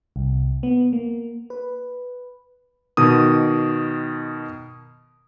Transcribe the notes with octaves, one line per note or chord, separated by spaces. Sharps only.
C2
B3
A#3
B4
B2 D#3 D#6